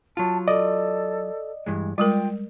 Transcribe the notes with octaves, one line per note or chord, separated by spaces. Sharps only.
F#3 F4 A5
A4 D5 D#5
G2 E3 G#3
G3 G#3 F4 A#4 G5